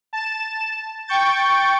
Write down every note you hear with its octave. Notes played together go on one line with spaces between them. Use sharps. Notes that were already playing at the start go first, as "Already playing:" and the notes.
A5 E7
G5 C#6 G6 A6